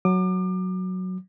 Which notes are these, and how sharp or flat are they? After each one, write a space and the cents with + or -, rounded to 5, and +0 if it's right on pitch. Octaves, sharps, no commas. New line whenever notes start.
F#3 -5 D6 +35